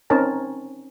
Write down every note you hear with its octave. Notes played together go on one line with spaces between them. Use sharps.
C4 C#4 D#4 A#4 G#5 A5